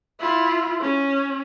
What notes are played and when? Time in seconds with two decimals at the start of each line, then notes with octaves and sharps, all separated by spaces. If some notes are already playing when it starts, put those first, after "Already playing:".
0.20 E4 F4
0.81 C#4